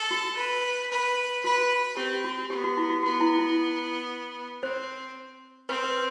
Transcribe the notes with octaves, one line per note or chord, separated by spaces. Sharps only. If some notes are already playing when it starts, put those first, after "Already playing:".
Already playing: A4
F#4
B4
B4
F#4 B4
C4 G4
F#4
B3 G4
F#4
E4
F#4
B3 F#4
E4
E4
C4 C5
C4 B4
B4